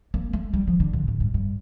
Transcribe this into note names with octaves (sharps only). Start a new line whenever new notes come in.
A#3
A3
G3
F3
D3
A#2
A2
G2
G2